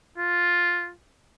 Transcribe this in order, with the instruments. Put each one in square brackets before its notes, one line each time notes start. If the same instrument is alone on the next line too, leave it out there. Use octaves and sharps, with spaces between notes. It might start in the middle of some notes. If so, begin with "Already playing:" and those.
[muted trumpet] F4